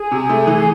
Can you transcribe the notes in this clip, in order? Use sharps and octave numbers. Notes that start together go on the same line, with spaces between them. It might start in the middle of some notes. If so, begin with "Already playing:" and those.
Already playing: G#4
C3
A3
E3